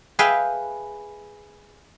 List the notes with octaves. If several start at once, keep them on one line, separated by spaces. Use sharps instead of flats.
G#4 B4 E5 F5 G5